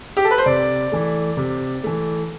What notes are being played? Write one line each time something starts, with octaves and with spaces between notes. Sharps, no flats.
G4
A4
B4
C5
C3 D5
E3 A3
C3
E3 A3